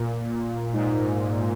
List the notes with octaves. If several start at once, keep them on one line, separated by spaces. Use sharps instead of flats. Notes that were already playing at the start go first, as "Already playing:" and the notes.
Already playing: A#2
G#2